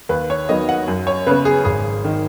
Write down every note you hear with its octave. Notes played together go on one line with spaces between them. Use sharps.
D#2 B4
C#5
D#3 F#3 B3 D#5
F#5
F#2
C#5
C#3 B3 B4
G#4
G#1 G#4
D#3